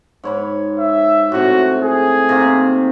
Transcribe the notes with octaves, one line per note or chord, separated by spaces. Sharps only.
G#2 C#5 B5
E5
A2 C3 F#4
G#4
C3 D#3 A#3